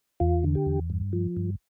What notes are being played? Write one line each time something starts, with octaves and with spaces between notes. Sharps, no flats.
E2 F4
D3
G4
E2
G2
F3
G2